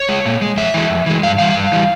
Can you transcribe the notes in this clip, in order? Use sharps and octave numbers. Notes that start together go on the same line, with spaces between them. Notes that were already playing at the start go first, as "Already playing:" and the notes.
Already playing: C#5
G#3
A#2
G#3
F2 E5
E3 G#3
F2
E3 G#3
G2 F5
E3 G3 F5
G2
E3 G3